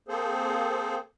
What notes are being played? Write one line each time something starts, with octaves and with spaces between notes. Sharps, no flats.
A#3 C4 G#4 A4 C5